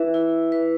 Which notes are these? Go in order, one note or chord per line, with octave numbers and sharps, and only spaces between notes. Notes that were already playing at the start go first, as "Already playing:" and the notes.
Already playing: E4 B4 E5
E4
B4